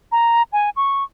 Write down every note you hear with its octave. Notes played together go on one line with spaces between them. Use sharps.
A#5
G#5
C#6